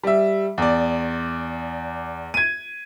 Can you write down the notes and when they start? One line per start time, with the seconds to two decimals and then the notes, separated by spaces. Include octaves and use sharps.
0.04 G3 E5
0.58 E2 D5
2.34 G#6 D#7